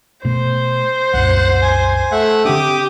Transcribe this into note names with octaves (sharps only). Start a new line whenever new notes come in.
B2 A3 C5
C2 F#2 A#2 F#5
G#5
A3 E5 F#5
D3 C4 D4 G4 D6 D#6